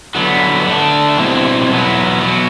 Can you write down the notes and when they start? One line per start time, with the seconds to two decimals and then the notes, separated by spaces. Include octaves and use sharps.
0.15 D3 F#3 B3
0.67 D3 A3 D4
1.18 B2 G3 C4 E4
1.71 E2 B2 F#3 B3
2.21 B2 F#3